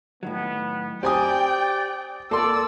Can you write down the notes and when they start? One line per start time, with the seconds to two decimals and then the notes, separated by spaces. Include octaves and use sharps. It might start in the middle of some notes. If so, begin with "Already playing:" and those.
0.23 A2 D#3 F#3 B3
1.03 C4 G4 D5 G5 G#5 D#6
2.31 A#3 A4 D5 C6 E6